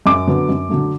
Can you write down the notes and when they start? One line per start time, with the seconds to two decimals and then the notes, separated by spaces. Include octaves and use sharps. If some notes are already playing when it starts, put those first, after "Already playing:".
0.06 F#2 D6
0.27 D3 F#3 B3
0.49 F#2
0.69 D3 F#3 A3